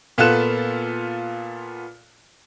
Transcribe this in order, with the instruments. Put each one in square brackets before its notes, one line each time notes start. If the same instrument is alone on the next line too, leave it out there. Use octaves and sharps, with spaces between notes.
[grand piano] A#2 B3 F4 A4 F#6 E7